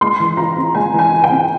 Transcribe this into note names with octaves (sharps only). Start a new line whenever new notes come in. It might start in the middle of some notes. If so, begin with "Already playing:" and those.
G#3 C6
E3
F4 A#5
C4
G#3 G#5
E3
G#5
F4
G5
C4